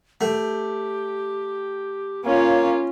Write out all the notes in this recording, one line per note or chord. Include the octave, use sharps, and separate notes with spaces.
A3 G4
A#3 C#4 F4 C#5